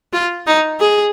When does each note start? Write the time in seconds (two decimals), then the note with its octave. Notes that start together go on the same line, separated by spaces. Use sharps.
0.13 F4
0.47 D#4
0.80 G#4